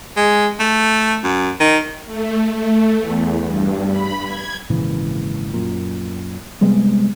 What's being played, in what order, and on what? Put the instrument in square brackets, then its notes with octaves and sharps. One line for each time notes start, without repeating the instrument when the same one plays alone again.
[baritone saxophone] G#3
A3
F#2
D#3
[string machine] A3
A3
E2
G2
B5
G#6
[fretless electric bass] G#1 A#2 C#3 E3
F#2 A#2
C3 G3 G#3 B3